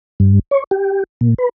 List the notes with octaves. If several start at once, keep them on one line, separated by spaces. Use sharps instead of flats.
G2
C#5
G4
A#2
B4